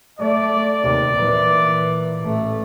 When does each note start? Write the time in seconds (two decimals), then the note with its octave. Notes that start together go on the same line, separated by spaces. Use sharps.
0.20 A3 D5
0.81 D#2 C3
1.15 A#2 E3
2.21 A1 A3